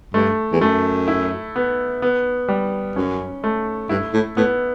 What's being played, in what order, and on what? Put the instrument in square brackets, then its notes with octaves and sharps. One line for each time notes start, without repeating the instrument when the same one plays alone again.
[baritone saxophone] G2 [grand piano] A3
[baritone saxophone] E2
[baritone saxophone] F#2 [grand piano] A3
[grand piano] E4
B3
B3
G3
[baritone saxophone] F#2 [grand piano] C#4
[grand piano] A3
[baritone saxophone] G2 [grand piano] E4
[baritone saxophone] A2
[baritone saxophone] A2 [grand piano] B3